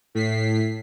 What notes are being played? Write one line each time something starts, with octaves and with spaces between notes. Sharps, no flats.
A2 B6 C7